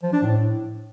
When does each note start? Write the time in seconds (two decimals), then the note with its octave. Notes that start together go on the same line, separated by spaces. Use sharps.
0.03 F3
0.13 D4
0.23 A2